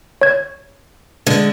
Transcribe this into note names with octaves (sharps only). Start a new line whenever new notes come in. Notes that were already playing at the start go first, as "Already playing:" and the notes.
C#5 G#6
D3 G#3